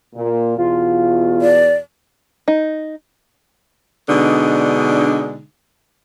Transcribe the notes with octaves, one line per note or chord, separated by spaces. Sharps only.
A#2
E2 B2 F4
D5
D#4
B2 D3 G#3 D4 D#4